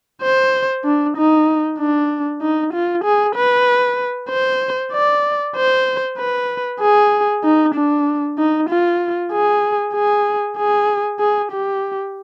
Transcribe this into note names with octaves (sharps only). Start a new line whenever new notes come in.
C5
D4
D#4
D4
D#4
F4
G#4
B4
C5
D5
C5
B4
G#4
D#4
D4
D#4
F4
G#4
G#4
G#4
G#4
G4